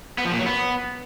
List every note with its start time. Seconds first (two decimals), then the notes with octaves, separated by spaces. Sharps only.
0.18 B3
0.25 F3
0.32 A#2
0.39 F#3
0.46 B3